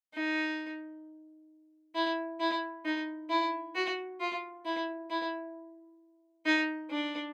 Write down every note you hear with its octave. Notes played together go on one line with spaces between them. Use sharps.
D#4
E4
E4
D#4
E4
F#4
F4
E4
E4
D#4
D4